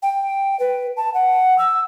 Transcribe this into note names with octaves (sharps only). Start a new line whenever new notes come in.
G5
B4
A5
F#5
E6